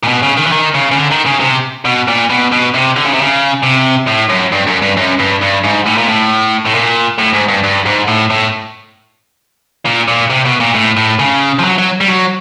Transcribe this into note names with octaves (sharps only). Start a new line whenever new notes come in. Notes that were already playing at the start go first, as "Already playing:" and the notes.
A#2
B2
C#3
D#3
E3
D#3
C#3
C#3
D3
D#3
C#3
C3
B2
A#2
B2
B2
C3
D3
C#3
C3
C#3
C3
A2
F#2
G2
F#2
G2
F#2
G2
G2
G#2
A2
A#2
A2
A2
A#2
A2
G#2
G2
G2
G#2
A2
A2
A#2
A#2
C3
B2
A#2
A2
A2
C#3
F3
F#3
F#3
G3
F#3